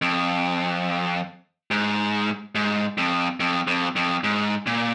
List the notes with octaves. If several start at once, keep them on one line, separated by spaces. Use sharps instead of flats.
F2
G#2
G#2
F2
F2
F2
F2
G#2
A#2